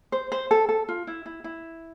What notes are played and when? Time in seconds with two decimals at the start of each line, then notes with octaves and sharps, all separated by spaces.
0.12 C5
0.32 C5
0.51 A4
0.69 A4
0.89 F4
1.07 E4
1.26 E4
1.44 E4